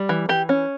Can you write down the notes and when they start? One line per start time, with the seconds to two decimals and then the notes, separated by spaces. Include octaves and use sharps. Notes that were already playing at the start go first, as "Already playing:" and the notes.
Already playing: G3
0.09 E3
0.29 E3 G4
0.49 C#4